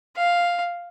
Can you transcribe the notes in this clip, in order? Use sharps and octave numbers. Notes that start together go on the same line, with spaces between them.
F5